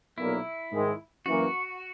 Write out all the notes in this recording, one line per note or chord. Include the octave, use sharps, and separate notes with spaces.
B1 A#2 A#3 E4
G#2 D#3 G#3
F#2 E3 A#3 F#4